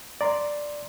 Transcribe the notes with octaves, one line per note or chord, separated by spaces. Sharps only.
D5 A#5 C6